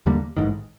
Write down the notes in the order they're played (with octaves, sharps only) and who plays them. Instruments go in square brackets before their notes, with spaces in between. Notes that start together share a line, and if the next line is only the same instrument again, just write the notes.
[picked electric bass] D#2 D3 G3 A#3
A1 G#2 D#3